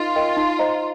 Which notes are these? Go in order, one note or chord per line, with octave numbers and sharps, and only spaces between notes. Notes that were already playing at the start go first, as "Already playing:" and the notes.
Already playing: D#4 F4 A#4 D#5
A#4 D#5 G5
D#4
C5 D#5 A#5